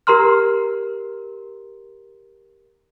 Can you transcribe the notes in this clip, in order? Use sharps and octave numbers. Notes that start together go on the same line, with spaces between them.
G4 A#4 A#5 C6 F6